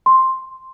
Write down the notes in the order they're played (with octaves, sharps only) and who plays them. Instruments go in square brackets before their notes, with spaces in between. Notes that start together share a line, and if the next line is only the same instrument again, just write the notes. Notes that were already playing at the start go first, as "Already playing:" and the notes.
[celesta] C6